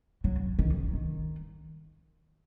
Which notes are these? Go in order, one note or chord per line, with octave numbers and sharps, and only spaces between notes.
F#3
D#3
D#3